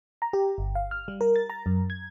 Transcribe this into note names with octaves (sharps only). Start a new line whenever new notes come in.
A#5
G4
G1
F5
F6
G3
A#4
A6
A#5
F#2
G#6